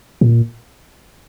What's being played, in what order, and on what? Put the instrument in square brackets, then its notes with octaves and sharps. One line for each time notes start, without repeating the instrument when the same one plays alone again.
[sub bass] A#2